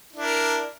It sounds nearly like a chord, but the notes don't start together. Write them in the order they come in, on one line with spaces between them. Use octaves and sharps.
E4 D4 A#4